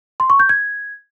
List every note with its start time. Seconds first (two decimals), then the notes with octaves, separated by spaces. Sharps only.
0.20 C6
0.30 C#6
0.40 G6
0.49 G#6